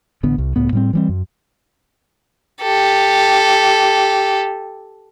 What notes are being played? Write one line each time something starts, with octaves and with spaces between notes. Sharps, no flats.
A1 D3 B3
C2
C#2 A2 B3
A2 G3 C4
E3 G3 C4
F#2
G4 A4